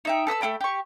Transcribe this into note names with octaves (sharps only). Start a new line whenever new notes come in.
D#4 E5 G5
A4 B4 D#6 E6
A3 C#4 G5 B5
G4 C#6